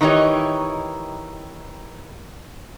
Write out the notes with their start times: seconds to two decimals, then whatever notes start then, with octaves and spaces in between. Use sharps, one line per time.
0.01 D#3 E3 D#4 G4 C#5